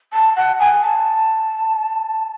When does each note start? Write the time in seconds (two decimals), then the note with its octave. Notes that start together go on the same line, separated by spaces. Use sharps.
0.13 A5
0.36 F#5
0.60 G#5
0.83 A5